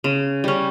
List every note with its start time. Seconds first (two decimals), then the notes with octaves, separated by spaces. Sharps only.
0.04 C#3
0.44 G3 C#4